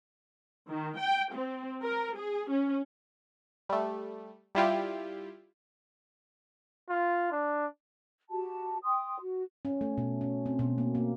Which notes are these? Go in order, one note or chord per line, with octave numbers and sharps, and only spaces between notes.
D#3
G5
C4
A#4
G#4
C#4
G3 A3
G3 E4 F4 G4
F4
D4
F#4 G4 A5
G5 C6 D#6
F#4
C#4
A3
B2
C#4
C4
B2
A#3
A#3